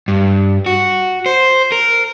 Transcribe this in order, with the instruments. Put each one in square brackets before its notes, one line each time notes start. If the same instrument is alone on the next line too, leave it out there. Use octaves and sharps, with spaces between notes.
[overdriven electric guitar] G2
F#4
C5
A#4